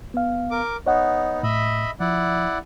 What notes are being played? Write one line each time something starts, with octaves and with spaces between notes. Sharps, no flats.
B3 F5
A#4 D6
B3 D#4 C#5 D#5 F#5
A2 D#5 E5 B5
F3 E4 D5 F#5